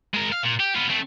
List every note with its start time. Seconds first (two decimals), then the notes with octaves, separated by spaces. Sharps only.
0.14 G#3 A#4
0.32 F5
0.44 A#2
0.60 G4
0.76 B3 F4
0.90 A3 C4